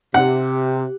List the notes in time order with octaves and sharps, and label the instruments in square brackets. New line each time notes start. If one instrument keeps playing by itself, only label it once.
[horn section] C3 [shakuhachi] G4 [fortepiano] F#5